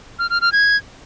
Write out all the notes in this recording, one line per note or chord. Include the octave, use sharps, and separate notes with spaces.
F6
F6
F6
G#6